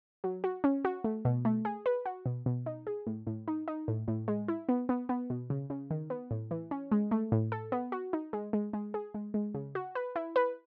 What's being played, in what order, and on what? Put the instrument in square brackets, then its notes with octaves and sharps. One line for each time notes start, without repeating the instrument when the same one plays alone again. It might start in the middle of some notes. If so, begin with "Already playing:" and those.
[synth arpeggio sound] F#3
F#4
C#4
F#4
A3
B2
A3
G#4
B4
F#4
B2
B2
D#4
G#4
A2
A2
D#4
D#4
A2
A2
G#3
E4
B3
B3
B3
B2
C#3
C#3
D#3
B3
A2
E3
C#4
G#3
A3
A2
A4
B3
F#4
D#4
G#3
G#3
G#3
G#4
G#3
G#3
C#3
F#4
B4
E4
B4